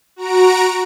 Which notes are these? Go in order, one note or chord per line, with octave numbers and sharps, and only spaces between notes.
F#4 A#5 D7